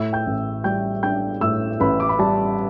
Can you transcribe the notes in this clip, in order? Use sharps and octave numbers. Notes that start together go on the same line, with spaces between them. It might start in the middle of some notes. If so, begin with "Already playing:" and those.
Already playing: A2 E5 E6
G5 G6
A1
G3 G5 G6
D4 G5 G6
A2 E5 E6
A1 B4 B5
D6
B5
G3 A5